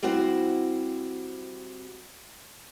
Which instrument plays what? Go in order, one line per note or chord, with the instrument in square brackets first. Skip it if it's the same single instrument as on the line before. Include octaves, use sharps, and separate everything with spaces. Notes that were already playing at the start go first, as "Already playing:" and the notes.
[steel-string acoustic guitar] G3 C4 E4 F#4 C5